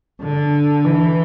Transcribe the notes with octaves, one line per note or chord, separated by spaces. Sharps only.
D3
E3